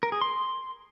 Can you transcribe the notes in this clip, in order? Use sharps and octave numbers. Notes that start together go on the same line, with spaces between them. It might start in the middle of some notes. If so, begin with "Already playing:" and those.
A#4
G#4
C6